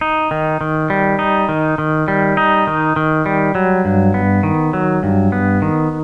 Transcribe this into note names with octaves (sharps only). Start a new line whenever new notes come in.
D#4
D#3
D#3
G3
D#4
D#3
D#3
G3
D#4
D#3
D#3
G3
F#3
G2
B3
D#3
F#3
G2
B3
D#3